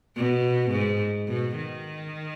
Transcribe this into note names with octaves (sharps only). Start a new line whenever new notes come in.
B2
G#2
B2
D#3